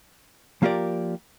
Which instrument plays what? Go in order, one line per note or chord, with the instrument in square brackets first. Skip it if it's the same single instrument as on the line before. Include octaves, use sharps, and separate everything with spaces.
[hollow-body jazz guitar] F3 A#3 F4 G4 A#4 D5